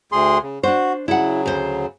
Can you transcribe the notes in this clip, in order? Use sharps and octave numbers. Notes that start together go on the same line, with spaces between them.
D2 G#4 C6
C#3
D4 F#4 C5
C#3 F#3 E4 F#5
D2 C5